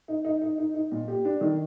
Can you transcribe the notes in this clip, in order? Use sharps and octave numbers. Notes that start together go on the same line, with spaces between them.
D#4
D#4
D#4
D#4
D#4
A#2
G4
D4
D#3